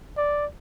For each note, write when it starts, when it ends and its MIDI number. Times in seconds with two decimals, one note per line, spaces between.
0.17 0.46 74